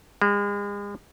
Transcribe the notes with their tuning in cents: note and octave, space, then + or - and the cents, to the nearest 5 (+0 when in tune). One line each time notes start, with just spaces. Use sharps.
G#3 -40